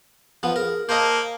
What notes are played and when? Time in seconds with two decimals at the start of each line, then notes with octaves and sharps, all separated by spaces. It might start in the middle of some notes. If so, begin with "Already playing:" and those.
0.43 F3 B3 F5
0.56 G#4 A#4
0.89 A#3 C5 D#5 A5